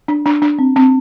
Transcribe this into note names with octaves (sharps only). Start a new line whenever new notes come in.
D4
D4
D4
C4
C4